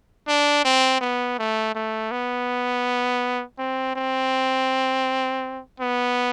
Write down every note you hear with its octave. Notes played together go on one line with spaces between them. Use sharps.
D4
C4
B3
A3
A3
B3
C4
C4
B3